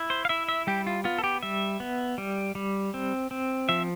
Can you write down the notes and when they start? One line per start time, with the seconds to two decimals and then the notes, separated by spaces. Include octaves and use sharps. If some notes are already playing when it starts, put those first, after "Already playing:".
Already playing: E4
0.10 C5
0.25 F5
0.29 E4 E5
0.49 E5
0.67 G3 G4
0.87 F4
1.04 B3 F4
1.18 A4
1.24 G4
1.43 G3 E5
1.80 B3
2.18 G3
2.55 G3
2.94 C4
3.31 C4
3.69 F3 E5